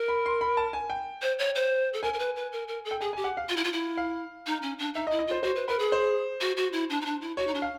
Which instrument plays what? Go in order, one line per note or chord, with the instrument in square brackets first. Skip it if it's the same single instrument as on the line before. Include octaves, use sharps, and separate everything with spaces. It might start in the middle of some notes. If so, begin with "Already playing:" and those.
Already playing: [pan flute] A#4
[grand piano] B5
C6
B5
A5
G#5
G5
[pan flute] C5
C#5
C5
A4
[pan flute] A#4 [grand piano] G#5
[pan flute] A#4
B4
B4
A#4
A#4
A4
[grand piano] G5
[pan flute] G#4 [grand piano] G#5
[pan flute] G4 [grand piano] G#5
[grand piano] F#5
F5
[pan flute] F4
E4
F4
E4
[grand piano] F5
[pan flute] D#4
C#4
D4
[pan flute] D#4 [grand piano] E5
[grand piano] D#5
[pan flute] E4
[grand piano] D#5
[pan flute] F4 [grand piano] C5
[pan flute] F#4 [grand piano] C5
[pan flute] B4
[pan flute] A#4 [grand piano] B4
[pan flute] G#4
[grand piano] C5
[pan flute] F#4
F#4
E4
D4
D#4
D4
E4
[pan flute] F#4 [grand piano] C#5
[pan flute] D#4
D4
[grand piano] F5